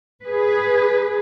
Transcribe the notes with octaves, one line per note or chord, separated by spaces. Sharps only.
G#4 B4